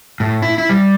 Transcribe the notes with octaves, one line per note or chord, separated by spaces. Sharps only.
A2
E4
E4
G3